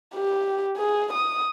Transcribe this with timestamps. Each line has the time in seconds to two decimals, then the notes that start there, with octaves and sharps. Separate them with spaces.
0.15 G4
0.77 G#4
1.13 D#6